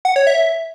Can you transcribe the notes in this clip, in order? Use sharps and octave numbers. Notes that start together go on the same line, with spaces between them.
F#5
C#5
E5